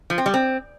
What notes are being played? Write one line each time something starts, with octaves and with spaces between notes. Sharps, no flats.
F3
C4
G3
C4